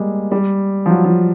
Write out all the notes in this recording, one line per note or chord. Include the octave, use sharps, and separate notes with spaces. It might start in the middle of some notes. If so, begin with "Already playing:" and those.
Already playing: G3 G#3 A#3
G3
F3
F#3
F3